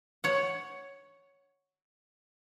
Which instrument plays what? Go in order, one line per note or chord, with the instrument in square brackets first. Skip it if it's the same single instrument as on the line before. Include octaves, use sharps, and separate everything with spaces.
[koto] C#5 F#5